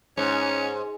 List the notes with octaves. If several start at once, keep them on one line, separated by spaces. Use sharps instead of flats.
G#2 C#4